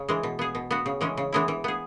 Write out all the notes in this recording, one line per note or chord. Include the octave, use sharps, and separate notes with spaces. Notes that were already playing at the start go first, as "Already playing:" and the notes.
Already playing: C#3
E3 G#3
B2
B3 G#4
B2
B3 F#4
C#3
E3 G#3 C#4
C#3
E3 G#3 B3 E4
E3
B3 G#4